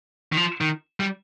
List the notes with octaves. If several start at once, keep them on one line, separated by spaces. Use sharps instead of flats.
D#3
F3
D#3
G3